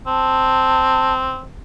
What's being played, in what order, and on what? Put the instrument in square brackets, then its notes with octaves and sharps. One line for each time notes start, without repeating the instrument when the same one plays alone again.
[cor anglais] C4 [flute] A5